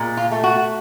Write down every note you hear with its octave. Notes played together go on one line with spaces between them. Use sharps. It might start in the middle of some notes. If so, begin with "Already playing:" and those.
Already playing: A#2 G#3
F4
A3
F#4